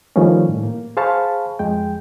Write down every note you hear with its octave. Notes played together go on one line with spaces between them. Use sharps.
D#3 F3 G3 A3 C#4
A2
A#3
G#4 C5 F5 A5 B5 C#6
F2 G#3 G5